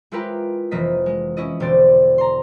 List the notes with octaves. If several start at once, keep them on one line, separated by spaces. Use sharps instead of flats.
G#3 E4 F4 G4 A#4 B4
F1 E3 A#3 D#5 B6
G#3
C#4 E4 D#5
E1 D3 C5 D5
A#5 C6